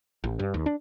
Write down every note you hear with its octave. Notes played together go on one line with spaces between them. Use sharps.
A1
G2
D#2
D4